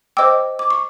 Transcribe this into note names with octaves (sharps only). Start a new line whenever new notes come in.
C5 D#5 G5 D6 E6
D6
C#6